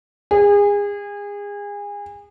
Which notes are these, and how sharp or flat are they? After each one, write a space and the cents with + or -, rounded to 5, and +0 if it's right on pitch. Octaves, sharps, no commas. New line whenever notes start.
G#4 -30